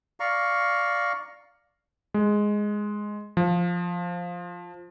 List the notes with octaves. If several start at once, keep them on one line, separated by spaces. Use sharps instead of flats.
D5 F5 A#5 C#6
G#3
F3